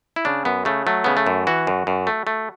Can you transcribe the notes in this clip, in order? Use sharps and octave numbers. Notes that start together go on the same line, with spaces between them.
E4
C#3 D4
F#2 B3
C#3 A3
F#3 A3
C#3 B3
A3
F#2
E3 F#4
F#2
F#2
A3
A3